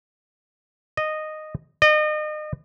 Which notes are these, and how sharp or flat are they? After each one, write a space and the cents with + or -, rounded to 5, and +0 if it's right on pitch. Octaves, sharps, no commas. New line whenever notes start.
D#5 -10
D#5 -35